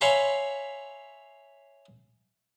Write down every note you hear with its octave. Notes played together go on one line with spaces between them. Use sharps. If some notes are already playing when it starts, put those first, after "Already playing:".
C#5 E5 F5 G#5 B5 C6